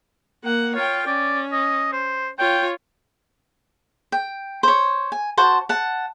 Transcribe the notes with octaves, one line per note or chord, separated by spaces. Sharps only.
A#3 F#5
F4 C#5 G5
C#4 D5
D#5
C5
F4 C#5 G5
G5
C5 C#5
G#5
F#4 C5 A5
F#5 A5